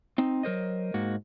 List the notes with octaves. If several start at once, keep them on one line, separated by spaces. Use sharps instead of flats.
C4 D#4
F#3 A#4 C5 D#5
G#2 A#3 F#4